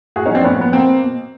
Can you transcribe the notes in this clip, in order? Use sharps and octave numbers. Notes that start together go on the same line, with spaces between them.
A2 F#4 G#4
C#4 D#4
F3 C4 D4
A2 B3 C#4
F3 B3
B2 A#3 C4
B2